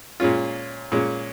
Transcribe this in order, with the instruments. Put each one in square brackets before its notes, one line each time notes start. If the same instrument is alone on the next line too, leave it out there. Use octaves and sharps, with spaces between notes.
[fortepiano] A#2 G#3 C#4 F4
A#2 G#3 C#4